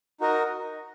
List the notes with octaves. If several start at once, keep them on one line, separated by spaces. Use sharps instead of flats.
D#4 F#4 A#4 D#5